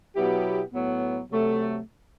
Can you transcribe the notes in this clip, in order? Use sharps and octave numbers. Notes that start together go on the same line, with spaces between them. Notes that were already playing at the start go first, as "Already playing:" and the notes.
B2 F#3 B3 E4 G4
A2 F#3 B3
C3 F#3 A3